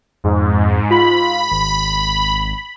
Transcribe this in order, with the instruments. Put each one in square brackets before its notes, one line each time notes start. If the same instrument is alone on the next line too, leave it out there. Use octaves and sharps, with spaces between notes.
[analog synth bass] F2 [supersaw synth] G#2
[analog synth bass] F4 [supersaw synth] B5
[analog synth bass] G#1